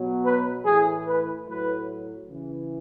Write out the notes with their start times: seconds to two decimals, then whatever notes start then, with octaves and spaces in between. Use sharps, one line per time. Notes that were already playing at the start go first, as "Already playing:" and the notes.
Already playing: B2 F#3
0.24 B4
0.65 A2 E3 G#4
1.06 B4
1.46 A2 F#3 B4
2.28 C#3 E3